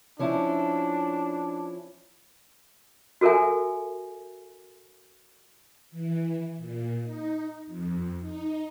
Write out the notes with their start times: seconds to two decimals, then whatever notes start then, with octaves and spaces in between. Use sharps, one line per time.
0.19 F3 C#4 D4 E4
3.21 F#4 A4 A#4 E5 G#5
5.91 E3
6.57 A#2
7.03 D#4
7.67 F2
8.20 D#4